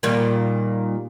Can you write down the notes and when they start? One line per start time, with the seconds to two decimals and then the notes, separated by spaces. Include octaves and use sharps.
0.03 A#2 D#3 G3